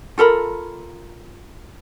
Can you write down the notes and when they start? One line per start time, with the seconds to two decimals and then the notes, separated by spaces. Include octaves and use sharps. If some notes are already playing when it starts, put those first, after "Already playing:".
0.18 F4 A4 A#4 B5